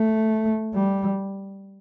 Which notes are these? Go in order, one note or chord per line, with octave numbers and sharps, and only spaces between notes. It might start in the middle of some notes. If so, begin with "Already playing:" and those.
Already playing: A3
G3